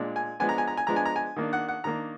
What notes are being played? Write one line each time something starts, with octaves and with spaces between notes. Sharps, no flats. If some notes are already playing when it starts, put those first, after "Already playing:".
Already playing: A#2 G#3 D4
G#5
F3 G#3 B3 D4 G#5
A#5
G#5
A#5
G#5
F3 G#3 B3 D4 A#5
G#5
A#5
G#5
D#3 A#3 D4
F#5
F#5
D#3 A#3 D4 A#5